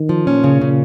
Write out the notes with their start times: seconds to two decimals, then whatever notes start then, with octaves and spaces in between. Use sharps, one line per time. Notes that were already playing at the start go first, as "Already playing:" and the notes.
Already playing: D#3
0.09 F3
0.27 A#2 C#4
0.44 C#3
0.61 C#3